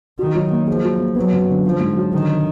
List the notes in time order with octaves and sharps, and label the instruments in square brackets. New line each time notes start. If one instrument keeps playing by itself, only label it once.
[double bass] D#3 [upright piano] F#4
[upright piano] F#3
A#3
[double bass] F3 [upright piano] G#4
[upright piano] F#3
A#3
[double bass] F#3 [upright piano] B3
[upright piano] F#2
D3
[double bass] F3 [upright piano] F4
[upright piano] G#2
F#3
[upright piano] D3 [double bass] D#3
[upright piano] D3